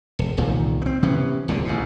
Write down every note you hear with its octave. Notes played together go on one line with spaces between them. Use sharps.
E1
E1 C2 A#2 D#3
B3 C4
C3 E3 B3 C#4
D1 C#2 A#2 D3
A1 G#2 B2